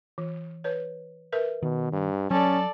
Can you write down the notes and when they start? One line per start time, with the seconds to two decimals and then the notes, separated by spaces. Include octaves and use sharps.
0.18 E3
0.64 B4 C#5
1.33 A#4 B4 E5
1.62 B2 D#3
1.93 G2
2.31 F#3 C#4 A4 D5